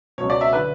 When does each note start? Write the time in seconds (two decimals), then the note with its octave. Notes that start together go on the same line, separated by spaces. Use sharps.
0.18 B2 C#5
0.22 C#2
0.30 D5
0.41 E5
0.53 D3 B4